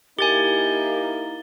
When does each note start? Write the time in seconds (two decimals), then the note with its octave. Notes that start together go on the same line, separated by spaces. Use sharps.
0.19 A#3 D#4 E4 G4 A#4 G#5 A6 G7